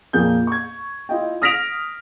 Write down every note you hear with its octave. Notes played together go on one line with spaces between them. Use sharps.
F2 A#2 A#3 G#4 G6
C#6 G#6
E4 F4 D#5 G5
D#6 F6 A#6 B6 D7 F7